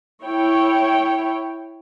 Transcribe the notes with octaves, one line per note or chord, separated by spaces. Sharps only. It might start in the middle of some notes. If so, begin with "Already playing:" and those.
E4 C#5 G5